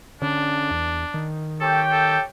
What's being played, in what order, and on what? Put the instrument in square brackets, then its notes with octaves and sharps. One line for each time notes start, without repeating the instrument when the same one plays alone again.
[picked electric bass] D3 C#4 [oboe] D4
[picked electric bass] E2
D#3
[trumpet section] G4 C#5 G5 [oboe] A4
[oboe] A4